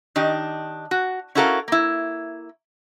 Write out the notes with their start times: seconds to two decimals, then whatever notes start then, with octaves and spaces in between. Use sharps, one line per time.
0.16 D#3 D4 D#4 G4
0.91 F#4
1.35 C#4 E4 F#4 A4 A#4 F5
1.68 A#3 E4